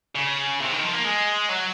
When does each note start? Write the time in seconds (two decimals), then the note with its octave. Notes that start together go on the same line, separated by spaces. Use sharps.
0.15 C#3
0.60 C3
0.71 D#3
0.82 F3
0.93 A#3
1.04 G#3
1.49 F#3